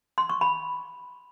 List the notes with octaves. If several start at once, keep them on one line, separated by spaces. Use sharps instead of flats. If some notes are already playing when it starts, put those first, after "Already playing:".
C6
C#6
B5